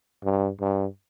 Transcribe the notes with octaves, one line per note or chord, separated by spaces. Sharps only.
G2
G2